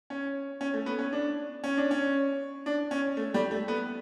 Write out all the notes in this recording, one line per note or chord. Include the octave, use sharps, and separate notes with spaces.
C#4
C#4
A3
B3
C#4
D4
C#4
D4
C#4
D4
C#4
A3
G3
A3
B3